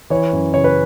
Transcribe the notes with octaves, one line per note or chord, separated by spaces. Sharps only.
E3 C#5
F#2
C#3 C#5
B4